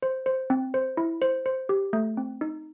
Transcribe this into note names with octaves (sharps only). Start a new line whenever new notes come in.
C5
C5
C4
C5
E4
C5
C5
G4
A3
C4
D#4